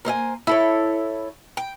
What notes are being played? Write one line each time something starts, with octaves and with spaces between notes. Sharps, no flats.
A#3 C5 E5 G#5
E4 A4 C#5
G5